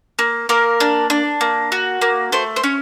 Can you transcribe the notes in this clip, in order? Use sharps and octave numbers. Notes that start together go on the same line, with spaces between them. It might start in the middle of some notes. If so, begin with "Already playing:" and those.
A#3
A#3 A#4
D4
D4
A#3
F#4
A#3
A3 C5
C5
C#4 C#5